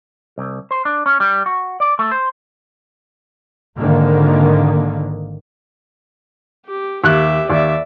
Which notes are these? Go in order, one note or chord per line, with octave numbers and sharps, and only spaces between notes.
C2
C5
D4
C#4
G3
F#4
D5
A3
C5
G#1 D3 D#3 A#3
G4
D#2 G4 E5 F#6
D#2 D5 E5